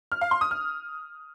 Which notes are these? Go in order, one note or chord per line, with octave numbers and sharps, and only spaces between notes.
F6
F5
C6
D#6
F6